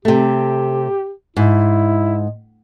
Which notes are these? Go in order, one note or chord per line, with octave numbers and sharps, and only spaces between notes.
C3 A3 G4
G#2 E4